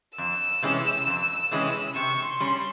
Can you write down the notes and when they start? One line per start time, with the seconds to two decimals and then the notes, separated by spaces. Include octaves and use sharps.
0.18 F2 E6
0.63 C3 E3 G#3 C#4
1.07 F2
1.51 C3 E3 G#3 C#4
1.96 C3 C#6
2.25 C6
2.40 G3 C#4